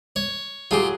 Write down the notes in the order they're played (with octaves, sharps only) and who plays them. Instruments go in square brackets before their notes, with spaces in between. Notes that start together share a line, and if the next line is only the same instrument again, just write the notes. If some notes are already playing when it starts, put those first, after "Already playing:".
[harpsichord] C#5
[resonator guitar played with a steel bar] F#3 G#4 [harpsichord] F4 G4